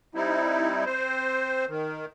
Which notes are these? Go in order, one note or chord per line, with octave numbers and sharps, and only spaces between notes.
G3 C4 D#4 E4
C4 C5
D#3